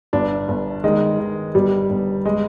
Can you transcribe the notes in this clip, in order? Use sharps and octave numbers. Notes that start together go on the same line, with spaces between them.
G1 D4
G1
D#3 G#3
D#3
G1 G3
G1
G#3